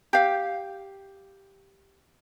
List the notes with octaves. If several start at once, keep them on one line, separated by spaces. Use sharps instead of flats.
G4 F5